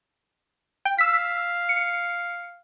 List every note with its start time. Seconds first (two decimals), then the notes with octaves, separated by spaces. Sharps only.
0.85 G5
0.99 F5 E6 B6
1.69 C#7